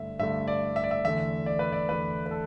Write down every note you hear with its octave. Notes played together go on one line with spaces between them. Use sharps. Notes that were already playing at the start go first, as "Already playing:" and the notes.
Already playing: G2 D3 A3 E5
G2 D3 A3 E5
D5
E5
D5
E5
E2 D3 A3 E5
D5
B4
D5
E2 D3 A3 B4
B4
A4